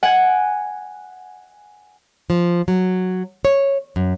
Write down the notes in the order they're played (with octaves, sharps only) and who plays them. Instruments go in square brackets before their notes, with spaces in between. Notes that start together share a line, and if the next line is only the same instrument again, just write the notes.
[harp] F#5 G#5
[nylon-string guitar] F3
F#3
C#5
F#2